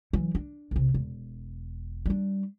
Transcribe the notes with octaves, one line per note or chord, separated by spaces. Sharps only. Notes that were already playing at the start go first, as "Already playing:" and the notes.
E3 F#3
D4
B1 C3
E1
G3 D4